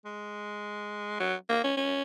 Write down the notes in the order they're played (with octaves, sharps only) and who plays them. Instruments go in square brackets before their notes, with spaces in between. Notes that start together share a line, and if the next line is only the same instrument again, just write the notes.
[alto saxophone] G#3
F#3
A#3
C#4
C#4